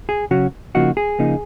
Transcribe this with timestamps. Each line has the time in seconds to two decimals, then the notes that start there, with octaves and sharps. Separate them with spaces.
0.09 G#4
0.31 C#3 F#3 C#4 F#4
0.75 C#3 F3 A#3 D#4 F#4
0.97 G#4
1.19 C#3 F3 A#3 D#4